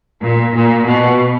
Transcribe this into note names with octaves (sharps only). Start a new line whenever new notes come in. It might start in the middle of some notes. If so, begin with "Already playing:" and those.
A#2
A#2
B2